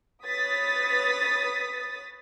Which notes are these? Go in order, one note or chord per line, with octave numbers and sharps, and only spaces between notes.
B4 C#5 D#6 A6 B6